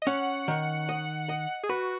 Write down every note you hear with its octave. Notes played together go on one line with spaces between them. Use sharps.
D#5
C#4 F#5
D#3
D#5
D#5
G#4
F#4 B4